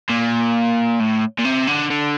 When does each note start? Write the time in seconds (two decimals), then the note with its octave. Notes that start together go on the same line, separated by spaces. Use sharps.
0.10 A#2
1.00 A2
1.39 A#2
1.45 C3
1.67 D3
1.90 D3